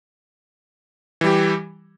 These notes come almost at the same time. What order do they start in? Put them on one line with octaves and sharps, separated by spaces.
E3 G3 G4